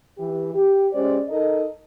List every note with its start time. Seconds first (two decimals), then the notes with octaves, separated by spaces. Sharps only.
0.18 E3 G4
0.54 G4
0.93 G#3 C#4 G4 C5 D5
1.29 D#4 A4 A#4 D#5